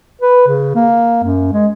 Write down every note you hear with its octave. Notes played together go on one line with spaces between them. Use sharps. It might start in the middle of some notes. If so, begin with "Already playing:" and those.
B4
C#3
A#3
F#2
G#3